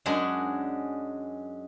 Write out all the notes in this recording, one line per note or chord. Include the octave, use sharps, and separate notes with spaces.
F#2 F#3 G#3 D4 G#4